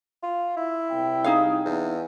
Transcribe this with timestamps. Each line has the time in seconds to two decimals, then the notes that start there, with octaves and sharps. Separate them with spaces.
0.23 F4
0.57 E4
0.91 C2 G5
1.24 D#4 G#4 F5
1.65 E2